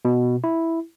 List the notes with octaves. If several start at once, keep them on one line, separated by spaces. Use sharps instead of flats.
B2
E4